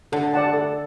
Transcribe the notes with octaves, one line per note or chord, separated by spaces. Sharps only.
D3 A4
D5 F#5 A5
A4